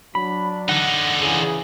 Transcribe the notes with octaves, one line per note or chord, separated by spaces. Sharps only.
F#3 D4 B5
D3 D#4 F#5
C#3 E3 G#4